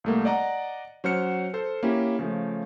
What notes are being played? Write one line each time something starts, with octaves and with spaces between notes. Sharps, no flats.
C2 A3 A#3
D5 D#5 F#5 A#5
F#3 C#4 C5 F#5 F6 C#7
A4 C5
A#3 C#4 E4 G4
C#3 F3 A3